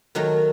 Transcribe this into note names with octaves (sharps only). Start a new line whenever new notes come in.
D#3 F#3 A3